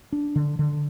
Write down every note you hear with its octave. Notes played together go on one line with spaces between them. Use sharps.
D4
D3
D3